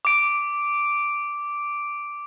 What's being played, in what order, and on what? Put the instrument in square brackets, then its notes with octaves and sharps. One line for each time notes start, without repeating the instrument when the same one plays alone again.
[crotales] D6 D7